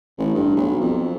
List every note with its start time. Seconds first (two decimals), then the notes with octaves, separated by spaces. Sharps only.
0.18 A1
0.34 G2
0.57 B1
0.80 F2